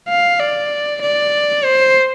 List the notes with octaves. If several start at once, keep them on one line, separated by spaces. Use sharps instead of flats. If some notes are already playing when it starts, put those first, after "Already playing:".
F5
D5
D5
C5